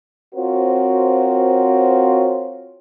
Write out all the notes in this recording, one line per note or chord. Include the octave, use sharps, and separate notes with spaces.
C4 F4 F#4 A#4 C5 C#5